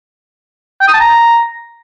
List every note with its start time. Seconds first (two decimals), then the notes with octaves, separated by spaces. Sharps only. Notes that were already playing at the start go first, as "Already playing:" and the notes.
0.81 G5
0.87 D#6
0.94 A5
1.00 A#5